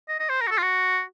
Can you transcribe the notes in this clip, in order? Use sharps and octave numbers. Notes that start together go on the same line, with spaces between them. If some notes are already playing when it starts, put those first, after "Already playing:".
D#5
D#5
C5
A#4
F#4
A4
F4
F#4